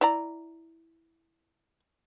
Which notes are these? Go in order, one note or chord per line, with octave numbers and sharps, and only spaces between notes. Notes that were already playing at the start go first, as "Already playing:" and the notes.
E4 D5 A#5